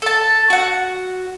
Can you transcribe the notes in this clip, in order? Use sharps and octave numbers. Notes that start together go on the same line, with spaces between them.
A4 A5
F#4 F#5